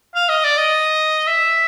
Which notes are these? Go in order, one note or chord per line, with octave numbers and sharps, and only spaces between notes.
F5
D#5
D5
D#5
E5